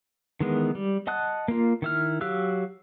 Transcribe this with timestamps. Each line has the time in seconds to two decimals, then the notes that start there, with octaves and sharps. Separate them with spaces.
0.40 D#3 E3 G#3 B3
0.75 G3
1.07 D#5 F#5 A5 D#6 F#6
1.48 A#3 F4
1.82 D#3 E4 F6
2.21 F#3 G4 F5 E6 F#6